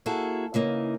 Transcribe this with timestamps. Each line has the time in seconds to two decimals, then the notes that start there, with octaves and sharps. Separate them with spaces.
0.06 A#3 E4 F#4 G#4 A4
0.54 C#3 E3 A#3 D#4